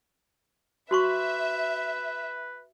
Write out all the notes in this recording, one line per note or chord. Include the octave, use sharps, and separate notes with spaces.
F#4 B4 E5 C6 C#6